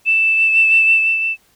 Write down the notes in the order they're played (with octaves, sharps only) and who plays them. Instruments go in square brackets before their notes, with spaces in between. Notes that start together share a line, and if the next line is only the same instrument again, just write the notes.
[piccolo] E7